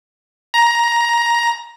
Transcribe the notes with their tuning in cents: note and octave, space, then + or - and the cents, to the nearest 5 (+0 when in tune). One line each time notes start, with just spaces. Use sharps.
A#5 +15